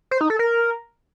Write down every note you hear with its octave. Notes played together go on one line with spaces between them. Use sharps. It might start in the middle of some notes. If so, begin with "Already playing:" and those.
C5
D#4
A4
A#4